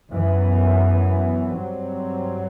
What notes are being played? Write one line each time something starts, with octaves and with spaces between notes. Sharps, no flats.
F#2 E3 B3
G2 F#3 C4